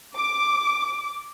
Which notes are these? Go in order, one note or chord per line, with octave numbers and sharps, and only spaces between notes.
D6